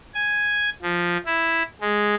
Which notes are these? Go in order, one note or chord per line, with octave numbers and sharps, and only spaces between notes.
G#5
F3
E4
G#3